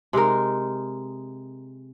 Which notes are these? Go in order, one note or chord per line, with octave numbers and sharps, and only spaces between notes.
C3 G#3 D#4 A#4